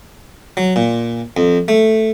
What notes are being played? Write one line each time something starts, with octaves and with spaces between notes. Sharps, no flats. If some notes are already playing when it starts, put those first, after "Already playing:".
F#3
A#2
F2
A3